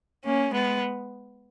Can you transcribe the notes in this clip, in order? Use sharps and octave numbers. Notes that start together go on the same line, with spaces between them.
A#3 C#4
G#3 B3